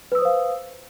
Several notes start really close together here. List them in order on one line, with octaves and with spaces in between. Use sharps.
B4 E6 D#6 C5 F5